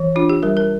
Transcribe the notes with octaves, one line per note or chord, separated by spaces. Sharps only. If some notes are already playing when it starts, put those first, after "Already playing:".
Already playing: E3
D4 F4
G4
G3 A#4
A#4